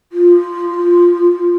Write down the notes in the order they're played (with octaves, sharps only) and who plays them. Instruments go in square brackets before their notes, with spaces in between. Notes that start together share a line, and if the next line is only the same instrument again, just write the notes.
[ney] F4